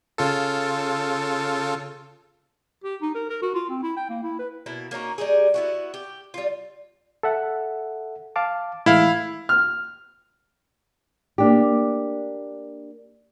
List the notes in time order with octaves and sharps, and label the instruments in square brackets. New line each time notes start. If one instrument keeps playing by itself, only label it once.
[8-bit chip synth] C#3 F4 A4
[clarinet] G4
D#4
A#4
A#4
F#4
F4
C4
E4
G5
A#3
E4
B4
[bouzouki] B2 A#3 E4
A#3 C#4 D#4 F#4
G3 D#4 G4 G#4
B3 E4 F#4
G4
G3 F4
[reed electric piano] A4 E5 F#5
F5 A5 D6
[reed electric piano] A2 E3 G#3 [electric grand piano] E4 F5
[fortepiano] F6
[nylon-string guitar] A#3 D4 G4